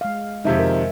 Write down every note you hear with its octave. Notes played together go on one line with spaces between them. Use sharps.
G#3 F5
F2 C3 D#3 G#3 E5
A#4